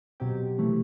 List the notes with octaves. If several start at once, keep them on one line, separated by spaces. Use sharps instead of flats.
B2 F#3 C4 G4
C3 E3 A3